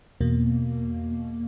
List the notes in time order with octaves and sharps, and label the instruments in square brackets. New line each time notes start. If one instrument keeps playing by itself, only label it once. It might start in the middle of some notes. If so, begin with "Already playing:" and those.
[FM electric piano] E2 B2 A#3